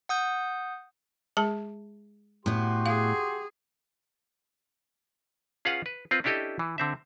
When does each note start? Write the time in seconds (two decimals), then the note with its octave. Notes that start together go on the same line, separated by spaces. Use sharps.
0.09 F#5 D#6 G6
1.37 G#3 G#4 A5
2.46 A2 B3 F#4 G4 C6
2.86 G#4 F5
5.65 C#4 F4 G#4 B4 F5 F#5
5.86 B4
6.11 C4 F4 B4
6.24 C#4 D4 E4 G4 A4 D#5
6.59 E3
6.78 D3 C4 E5